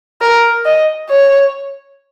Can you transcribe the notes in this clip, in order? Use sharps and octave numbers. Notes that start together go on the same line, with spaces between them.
A#4
D#5
C#5